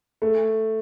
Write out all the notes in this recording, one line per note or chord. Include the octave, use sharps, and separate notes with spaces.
A3